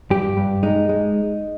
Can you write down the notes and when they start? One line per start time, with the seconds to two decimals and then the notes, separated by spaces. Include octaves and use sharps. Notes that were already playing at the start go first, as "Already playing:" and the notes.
0.11 G2 G4
0.37 G2
0.63 G#3 D#4
0.89 G#3